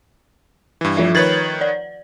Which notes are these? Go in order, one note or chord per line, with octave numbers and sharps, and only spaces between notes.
G2 E3
F3 F4 E5
D#3 B4 C#5 G#6 A6 F#7
D5